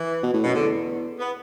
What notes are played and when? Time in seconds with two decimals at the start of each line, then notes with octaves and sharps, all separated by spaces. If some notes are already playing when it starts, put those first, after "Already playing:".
Already playing: E3
0.23 B2
0.34 A2
0.44 F#2 B2
0.55 E2 D3
1.20 B3